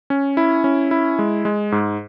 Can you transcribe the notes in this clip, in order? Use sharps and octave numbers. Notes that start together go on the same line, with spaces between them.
C#4
E4
C#4
E4
G#3
G#3
G#2